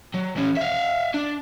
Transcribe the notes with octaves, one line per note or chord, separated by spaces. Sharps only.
F#3
E3 C#4
E5 F5
D4